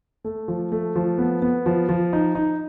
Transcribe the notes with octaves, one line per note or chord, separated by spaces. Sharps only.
A3
F3
A3
F3
B3
B3
F3
F3
D#4
D#4